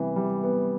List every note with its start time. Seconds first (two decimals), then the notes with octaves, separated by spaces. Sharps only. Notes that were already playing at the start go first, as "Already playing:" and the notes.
Already playing: C3 E3 G3 B3
0.16 G3
0.43 B3